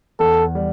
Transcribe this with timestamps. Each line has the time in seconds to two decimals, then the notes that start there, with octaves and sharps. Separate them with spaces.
0.19 E2 A4
0.55 G3